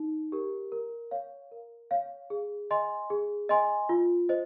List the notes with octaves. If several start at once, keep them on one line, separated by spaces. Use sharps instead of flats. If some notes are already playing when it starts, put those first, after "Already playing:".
Already playing: D#4
G4 A#4
A#4
C#5 F5
A#4
C#5 F5
G#4
D#5 G#5 C6
G#4
D#5 G#5 C6
F4
C5 D#5